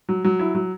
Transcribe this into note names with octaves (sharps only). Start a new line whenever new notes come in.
F#3
F#3
E4
F#3